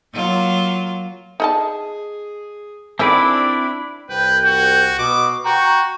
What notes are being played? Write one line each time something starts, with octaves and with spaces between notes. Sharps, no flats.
F#3 A#3 F4
D#4 G#4 D#5 A5
D3 D#3 C4 D4 E4 G#4 D5 B5
C2 B4 G5
F#4
B2 D6
F#4 G5 A#5 C#6